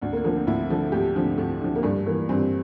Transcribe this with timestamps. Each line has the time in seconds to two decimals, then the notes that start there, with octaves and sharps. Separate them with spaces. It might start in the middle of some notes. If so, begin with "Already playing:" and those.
0.02 D2 D4
0.13 A#3
0.24 D3 F3 A#3
0.36 C4
0.47 D2 E4
0.70 D3 F3 A4
0.92 D2 G4
1.15 D3 F3
1.38 D2 A3
1.61 D3 F3
1.76 A#3
1.83 G2 A3
2.06 E3 A#3
2.29 G2 C4